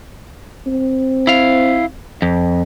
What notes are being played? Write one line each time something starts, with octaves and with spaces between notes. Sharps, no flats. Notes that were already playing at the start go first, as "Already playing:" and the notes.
C4
E4 F5
F2